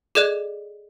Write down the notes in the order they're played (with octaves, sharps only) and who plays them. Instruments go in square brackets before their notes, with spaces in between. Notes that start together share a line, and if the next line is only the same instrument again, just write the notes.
[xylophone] G#4 A4 D5 D#5 F#6